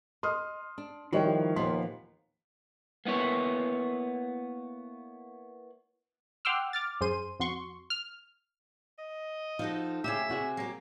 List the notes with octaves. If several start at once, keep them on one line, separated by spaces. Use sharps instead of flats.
D#5 C6 D#6 F6
D4
D#3 F3 G3 E4 F#4 C#5 G5
D#2 A#2 B3 C6 B6
A#3 B3 E4 C#5
F#5 G5 C6 D6 E6 F6
D6 F6 A6
F#2 G#4 C5 C6 D#7
F2 F#4 C6 C#6
F6
D#5
F3 D#4 F#4 A4
A2 C#3 F#3 G4 G#4 E5
C3 F#4 G#4
F#3 A#3 G4